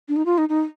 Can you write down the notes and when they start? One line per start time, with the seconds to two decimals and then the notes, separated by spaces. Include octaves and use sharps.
0.09 D4
0.16 D#4
0.26 F4
0.38 D#4
0.49 D#4